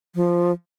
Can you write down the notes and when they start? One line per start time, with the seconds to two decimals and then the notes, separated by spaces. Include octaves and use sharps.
0.15 F3